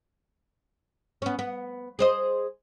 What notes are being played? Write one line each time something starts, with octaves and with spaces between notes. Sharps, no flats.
B3 C#4
B3
G#4 C5 D#5